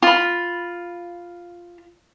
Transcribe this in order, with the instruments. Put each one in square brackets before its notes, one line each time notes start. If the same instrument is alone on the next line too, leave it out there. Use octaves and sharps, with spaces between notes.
[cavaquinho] F4 B5